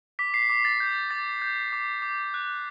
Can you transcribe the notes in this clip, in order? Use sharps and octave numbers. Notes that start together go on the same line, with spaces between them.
D6 B6
C7
B6
D6
A6
G6
D6 A6
G6
D6
D6
F#6